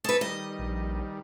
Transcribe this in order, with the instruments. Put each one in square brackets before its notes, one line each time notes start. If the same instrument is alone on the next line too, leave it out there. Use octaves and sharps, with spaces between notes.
[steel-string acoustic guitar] A4 B4 [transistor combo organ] D#5 G#5 C#6
[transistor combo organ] D#3 G3 [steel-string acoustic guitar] D#5
[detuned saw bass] A#1